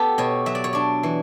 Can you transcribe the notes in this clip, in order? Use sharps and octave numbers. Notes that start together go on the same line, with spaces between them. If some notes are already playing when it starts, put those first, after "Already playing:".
Already playing: B3 G4 A4
B2 C#5
F#3 E5
D5
C#5
D4 D5
E3